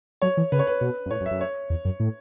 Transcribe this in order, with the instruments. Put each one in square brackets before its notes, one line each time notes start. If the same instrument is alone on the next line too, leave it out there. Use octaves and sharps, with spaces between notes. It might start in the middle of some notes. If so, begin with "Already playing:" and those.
[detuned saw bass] F#3 [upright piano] C#5
[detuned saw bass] E3
[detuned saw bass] C#3 [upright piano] B4
[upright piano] C#5
B4
[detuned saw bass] B2
F#2
[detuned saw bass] A2 [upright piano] C#5
[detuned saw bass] F#2
[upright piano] E5
[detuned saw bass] F#2
[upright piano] C#5
[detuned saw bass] E2
F#2
A2